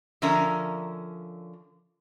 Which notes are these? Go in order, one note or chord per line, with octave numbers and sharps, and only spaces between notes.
D3 F3 C#4 A#4 E5 A#5